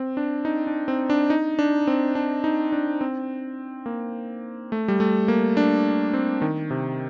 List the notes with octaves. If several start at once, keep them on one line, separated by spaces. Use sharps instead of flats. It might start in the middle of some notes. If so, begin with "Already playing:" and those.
Already playing: C4
D4
D#4
D4
C4
D4
D#4
D4
C4
D4
D#4
D4
C4
A#3
A3
G3
A3
A#3
D4
C4
D#3
C3